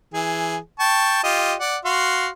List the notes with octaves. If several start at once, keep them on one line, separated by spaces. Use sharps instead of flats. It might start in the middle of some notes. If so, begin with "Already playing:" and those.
E3 G#4
G5 A5 C#6
F4 G4 D#5
D5 F#5
F#4 F5 C6